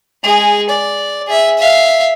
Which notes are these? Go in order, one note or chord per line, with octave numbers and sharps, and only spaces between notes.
G#3 G#4
D5
G#4 E5
E5 F5